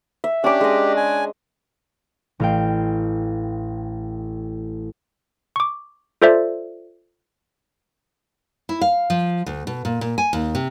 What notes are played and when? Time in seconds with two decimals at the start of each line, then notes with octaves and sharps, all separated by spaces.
0.24 E5
0.44 C#4 D4 G4 D6
0.61 G#3 D#5
0.97 G#5
2.40 A1 F5 G5
5.56 C#6 D6
6.22 F4 A4 C5 D5 E5
8.69 E4
8.81 F5
9.10 F3
9.46 D2
9.67 B2
9.85 A#2
10.01 A#2
10.18 G#5
10.33 D#2
10.55 C3